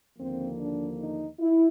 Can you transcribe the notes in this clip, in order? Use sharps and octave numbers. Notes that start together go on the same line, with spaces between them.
D#2 D3 F3 A#3 C4
D4
D#4
E4